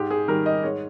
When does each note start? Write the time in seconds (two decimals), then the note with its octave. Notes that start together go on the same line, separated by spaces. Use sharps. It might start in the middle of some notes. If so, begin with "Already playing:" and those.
Already playing: G#2 G4
0.11 G#4
0.28 D#3 G3 A#4
0.46 D#5
0.63 G#2 C#5